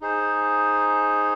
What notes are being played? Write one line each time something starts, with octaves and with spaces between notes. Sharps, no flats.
D#4 G#4 C5